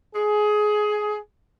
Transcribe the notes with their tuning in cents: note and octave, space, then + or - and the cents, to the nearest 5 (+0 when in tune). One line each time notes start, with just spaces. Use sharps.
G#4 +20